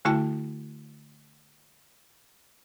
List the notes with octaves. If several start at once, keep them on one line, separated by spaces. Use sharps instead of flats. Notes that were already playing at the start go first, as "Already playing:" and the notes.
D3 A3 E4 F#4 G5 A5